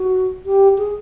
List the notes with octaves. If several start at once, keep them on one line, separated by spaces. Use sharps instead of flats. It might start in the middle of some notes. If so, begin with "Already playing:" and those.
Already playing: F#4
G4
G#4